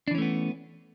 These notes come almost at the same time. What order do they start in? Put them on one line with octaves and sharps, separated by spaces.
D4 E3 C#4 A3 B3